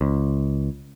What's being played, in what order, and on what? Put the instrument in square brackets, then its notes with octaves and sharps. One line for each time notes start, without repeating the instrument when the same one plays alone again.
[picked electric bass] C#2